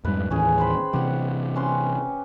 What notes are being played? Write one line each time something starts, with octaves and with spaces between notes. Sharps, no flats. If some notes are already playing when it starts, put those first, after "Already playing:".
F2 G#2 G3 B4
D#2 A2 E3 C#4 G#4
C5 G5 B5
C3 E3 G4 F#5
C#4 B4 C6